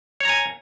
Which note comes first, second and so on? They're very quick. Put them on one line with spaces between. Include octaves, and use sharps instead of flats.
C#5 A#5 G#5